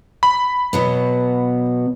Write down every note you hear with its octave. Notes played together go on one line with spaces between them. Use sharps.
B5
B2 F#3 B3